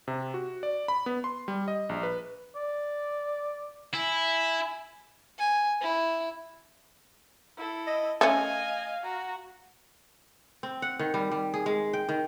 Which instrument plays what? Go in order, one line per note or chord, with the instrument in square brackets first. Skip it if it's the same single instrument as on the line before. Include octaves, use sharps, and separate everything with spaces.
[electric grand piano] C3
F#4
D5
B5
B3
C6
G3
D#5
A#1
B4
[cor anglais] D5
[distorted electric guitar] E4 [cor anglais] G#5
[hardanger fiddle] G#5
E4
[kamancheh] E4 A4
[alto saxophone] D#5
[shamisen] A3 C#4 [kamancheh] D#5 G#5 [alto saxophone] F5
[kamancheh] F#4 A#5
[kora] C4
F#5
D#3
G3
G3
G#4
G#3
G5
D#3